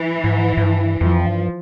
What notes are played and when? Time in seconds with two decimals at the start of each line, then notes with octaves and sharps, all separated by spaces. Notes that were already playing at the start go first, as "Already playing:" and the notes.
Already playing: E3
0.24 G#2
0.57 G#2
0.62 G2
1.01 F2 F3
1.26 G2